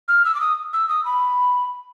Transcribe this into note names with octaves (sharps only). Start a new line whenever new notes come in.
F6
E6
D6
D#6
E6
D#6
B5